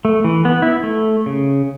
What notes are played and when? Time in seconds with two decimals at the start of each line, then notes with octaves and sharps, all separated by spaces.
0.05 A3
0.24 E3
0.45 B3
0.62 E4
0.84 A3
1.26 C#3